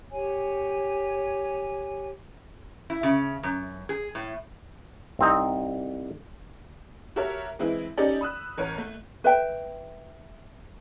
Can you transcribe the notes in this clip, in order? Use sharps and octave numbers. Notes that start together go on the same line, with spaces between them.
G4 C#5 G#5
E4
C#3
F#2
G#4
A2
C2 C4 D#4 D#5
F#4 G4 A4 A#4 C#5 E5
E3 G#3 C4 E4
C#4 D#4 G4 A4 D5 D#5
B5 D#6 E6 F#6
A1 A#4 C#5 D#7
A3
B4 E5 G5